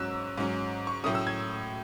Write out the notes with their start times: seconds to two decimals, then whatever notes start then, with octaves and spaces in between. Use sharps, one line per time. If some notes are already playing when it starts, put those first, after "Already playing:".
Already playing: G#2 F#3 C#4 E6 F#6
0.38 G#2 F#3 C#4
0.87 C#6
1.04 A2 F#3 A3 C#4 D#6
1.15 E6
1.27 G#6